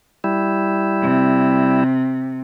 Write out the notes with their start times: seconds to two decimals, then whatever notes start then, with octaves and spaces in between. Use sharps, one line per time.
0.24 G3 E4
1.02 C3